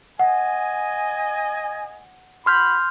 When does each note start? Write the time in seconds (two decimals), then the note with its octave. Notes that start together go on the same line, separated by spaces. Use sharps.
0.19 D#5 F#5 G#5
2.46 F#4 B5 C6 F6 G6